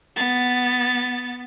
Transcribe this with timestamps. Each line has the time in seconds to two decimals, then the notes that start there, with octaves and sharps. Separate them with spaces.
0.16 B3 A6